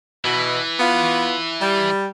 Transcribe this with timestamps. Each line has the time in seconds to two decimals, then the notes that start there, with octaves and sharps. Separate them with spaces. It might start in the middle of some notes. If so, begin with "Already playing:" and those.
0.25 B2 E3
0.80 B3 F4
1.60 G3